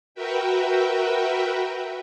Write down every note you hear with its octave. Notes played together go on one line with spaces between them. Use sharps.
F#4 A#4 B4 E5 G5